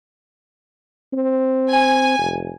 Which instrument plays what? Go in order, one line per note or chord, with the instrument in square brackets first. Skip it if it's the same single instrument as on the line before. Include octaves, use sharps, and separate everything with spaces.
[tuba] C4
[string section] G#5
[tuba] F1